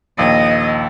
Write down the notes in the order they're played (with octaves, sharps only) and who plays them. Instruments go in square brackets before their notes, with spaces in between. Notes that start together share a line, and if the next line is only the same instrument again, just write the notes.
[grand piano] A#1 D#2 [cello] D#5